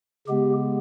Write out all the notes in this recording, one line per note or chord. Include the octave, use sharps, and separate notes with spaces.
C#3 G#3 B3 G4